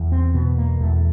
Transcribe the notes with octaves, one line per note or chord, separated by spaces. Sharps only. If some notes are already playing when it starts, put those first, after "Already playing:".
Already playing: E2
C4
B2 B3
A#3
E2 A3